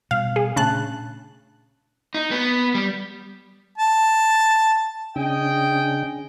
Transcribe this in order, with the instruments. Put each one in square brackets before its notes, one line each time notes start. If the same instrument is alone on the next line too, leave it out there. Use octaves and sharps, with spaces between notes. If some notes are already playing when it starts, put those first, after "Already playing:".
[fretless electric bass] B2 G3 [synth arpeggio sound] F5
[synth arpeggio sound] G#4
[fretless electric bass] A#2 A3 D4 [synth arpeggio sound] C#3 A5 F#6
[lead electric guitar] D#4
B3
G3
[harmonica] A5
[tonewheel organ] C#3 C#4 D4 [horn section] G#4 D#5 G5